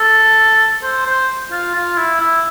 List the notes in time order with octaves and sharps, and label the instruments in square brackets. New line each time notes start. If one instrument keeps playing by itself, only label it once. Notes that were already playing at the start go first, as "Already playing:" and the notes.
Already playing: [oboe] A4
C5
C5
F4
F4
E4
E4